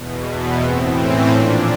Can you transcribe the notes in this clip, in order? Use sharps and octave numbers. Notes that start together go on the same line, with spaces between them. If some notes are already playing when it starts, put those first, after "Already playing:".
Already playing: E2 B2
B3
A2 E3 C4
C#4
A#2 F3 D4